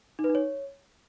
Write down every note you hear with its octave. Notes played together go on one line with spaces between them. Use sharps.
D#4
B4
D#4
C#5